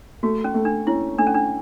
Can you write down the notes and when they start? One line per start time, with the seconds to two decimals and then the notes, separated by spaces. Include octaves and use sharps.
0.23 A3 F#4
0.44 C#4
0.54 A3
0.65 D4
0.87 C#4 E4
1.18 A3 D4
1.27 C#4
1.35 D4